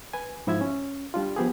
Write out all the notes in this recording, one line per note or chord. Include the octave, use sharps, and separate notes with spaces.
B4 G#5
G#2 F3 E4 E5 E6 G#6
C#4
G3 D4 F4
F3 B3 G4 G#4